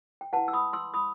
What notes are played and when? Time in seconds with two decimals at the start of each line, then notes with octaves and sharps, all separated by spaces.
0.21 G5
0.33 E4 B4 F#5 A5
0.48 E6
0.53 B5 D#6
0.73 C6 E6
0.94 B5 D#6